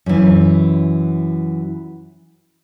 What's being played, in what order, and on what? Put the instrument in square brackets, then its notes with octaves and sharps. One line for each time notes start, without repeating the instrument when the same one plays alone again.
[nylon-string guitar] F#2 E3